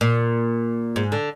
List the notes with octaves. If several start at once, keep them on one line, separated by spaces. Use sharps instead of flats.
A#2
G#2
D3